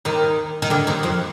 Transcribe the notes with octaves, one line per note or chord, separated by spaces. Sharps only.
D#2 D#3
D#3
D2 D3
D#2 D#3
F2 F3